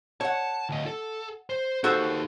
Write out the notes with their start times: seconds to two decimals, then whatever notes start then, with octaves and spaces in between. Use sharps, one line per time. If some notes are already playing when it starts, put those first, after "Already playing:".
0.21 C#5 F#5 A5
0.69 D2 D#5
0.86 A4
1.50 C5
1.84 D#4 F#4 G4 A4 C5